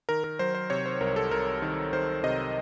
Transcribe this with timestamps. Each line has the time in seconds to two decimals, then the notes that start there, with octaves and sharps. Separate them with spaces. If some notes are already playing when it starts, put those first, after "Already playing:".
0.09 D#3 A#4
0.24 A#4
0.39 F#3 C5
0.55 C5
0.70 C3 C#5
0.86 C5
1.01 C2 A#4
1.16 A4
1.31 C2 A#4
1.62 D#3
1.93 D#3 C5
2.23 C3 D#5